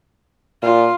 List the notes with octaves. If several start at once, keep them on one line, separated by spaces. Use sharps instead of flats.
A#2 F4